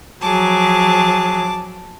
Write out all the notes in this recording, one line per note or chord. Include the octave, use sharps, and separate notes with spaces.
F3 F#3 G#4 A5 D6